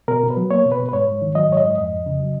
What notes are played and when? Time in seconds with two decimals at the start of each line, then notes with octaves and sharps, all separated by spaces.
0.08 B2 A#4
0.23 B2
0.30 B4
0.37 F#3
0.51 A#3 C#5
0.65 B2
0.72 B4
0.79 B2
0.89 B4
0.93 G#2 C#5
1.08 G#2
1.22 D#3
1.35 F#3 D#5
1.49 G#2 C#5
1.57 D#5
1.63 G#2
1.78 F2 D#5
1.92 F2
2.06 C#3
2.20 F#3